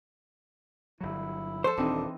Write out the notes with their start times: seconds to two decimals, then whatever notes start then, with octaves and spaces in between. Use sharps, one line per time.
1.01 G1 F#3 E4
1.64 F3 A4 C5
1.77 D#1 E3 C4 D4 D#4